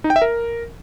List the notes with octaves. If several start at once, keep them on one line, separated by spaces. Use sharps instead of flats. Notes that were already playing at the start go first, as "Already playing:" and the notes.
D#4
G5
E5
A#4